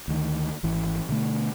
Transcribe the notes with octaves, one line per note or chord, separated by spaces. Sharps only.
D2 D#3
G#1 E3
B2 D3 A3